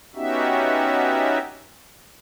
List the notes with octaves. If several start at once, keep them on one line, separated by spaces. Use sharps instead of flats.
B3 C#4 D#4 F#4 G4 E5